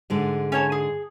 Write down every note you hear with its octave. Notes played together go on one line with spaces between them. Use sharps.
G#2 D3 G#3
C#4 C#5 A5
G#4